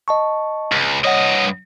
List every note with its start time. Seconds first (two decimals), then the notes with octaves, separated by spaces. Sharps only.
0.08 D#5 A5 C#6
0.72 C#2
1.05 G2 C#5 D#5 F#5